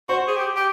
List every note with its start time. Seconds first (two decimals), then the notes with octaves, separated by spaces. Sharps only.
0.09 F#4 C5
0.28 G#4
0.37 G4
0.56 G4